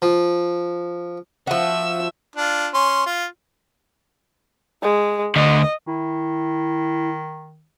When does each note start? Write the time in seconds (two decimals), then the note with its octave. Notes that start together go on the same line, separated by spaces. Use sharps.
0.02 F3
1.47 F3 F#4 E5 E6
2.36 D4 F4
2.74 C#4 C6
3.06 F4
4.83 G#3
5.36 D2 D3 D#5
5.87 D#3 E4